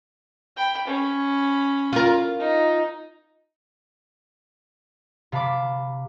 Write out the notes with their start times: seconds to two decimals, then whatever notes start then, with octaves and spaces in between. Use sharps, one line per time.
0.57 G5 B5
0.88 C#4 B5
1.93 F4 A#4
2.39 D#4
5.32 C3 F5 A5 B5 D6